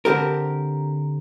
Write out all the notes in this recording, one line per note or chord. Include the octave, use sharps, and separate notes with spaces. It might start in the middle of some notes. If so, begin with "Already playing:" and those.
D3 C4 G4 A#4